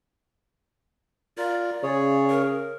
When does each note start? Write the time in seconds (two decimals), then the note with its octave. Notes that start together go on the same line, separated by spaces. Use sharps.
1.38 F4 A#4 D5
1.83 C#3 G#4 C#5
2.30 A#4